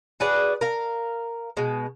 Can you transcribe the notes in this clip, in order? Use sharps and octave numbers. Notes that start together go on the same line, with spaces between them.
F#4 G#4 B4 D5
A#4 F5
B2 G#3